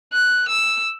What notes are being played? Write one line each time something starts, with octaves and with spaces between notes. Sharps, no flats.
F#6
E6